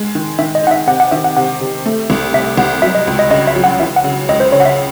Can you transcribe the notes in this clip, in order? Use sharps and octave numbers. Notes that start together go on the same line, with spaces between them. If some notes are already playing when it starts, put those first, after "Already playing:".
Already playing: G#3
D#3
D#3 E5
D#5
D#4 F#5
E5
C3 F#5
F#5
D#3 E5
F#5
C3 F#5
C3
A3
C2
C3 E5
C2 F#5
F#3 E5
D#5
C#2
D#5
C#3 D#5
E5
F#3
F#5
E3 E5
F#5
C#3
C#2 D#5
C5
C#3 C#5
F#5
E5